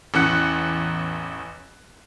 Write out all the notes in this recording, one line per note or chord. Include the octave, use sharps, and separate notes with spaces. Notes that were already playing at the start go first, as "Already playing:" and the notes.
A1 E2 C#4 F#5 F#6 C#7